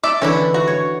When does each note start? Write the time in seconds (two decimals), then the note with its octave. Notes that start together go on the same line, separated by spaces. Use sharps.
0.03 A4 D5 E5
0.22 D3 E3 C#4 D4 E4
0.54 F#4
0.67 C#5